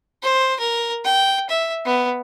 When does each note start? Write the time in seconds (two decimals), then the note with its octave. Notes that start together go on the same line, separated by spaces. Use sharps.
0.23 C5
0.59 A#4
1.04 G5
1.49 E5
1.85 B3